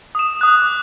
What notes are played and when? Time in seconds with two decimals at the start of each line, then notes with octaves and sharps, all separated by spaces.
0.15 D#6 E7
0.41 D#6 F#6
0.62 D6